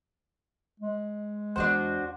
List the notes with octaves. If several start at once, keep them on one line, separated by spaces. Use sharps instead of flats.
G#3
E2 D4 F#4 C5 F#5